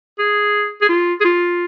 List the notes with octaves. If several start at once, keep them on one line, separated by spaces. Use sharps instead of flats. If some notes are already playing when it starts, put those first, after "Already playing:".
G#4
G#4
F4
G#4
F4